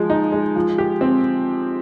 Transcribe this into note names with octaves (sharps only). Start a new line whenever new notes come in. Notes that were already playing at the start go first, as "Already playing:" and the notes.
Already playing: F3 G#3
D#4
G#3
F3
G4
C4